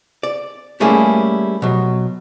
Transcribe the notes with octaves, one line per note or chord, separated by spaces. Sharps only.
D5
G3 A3 A#3 C#4 E4 G#4
B2 F#3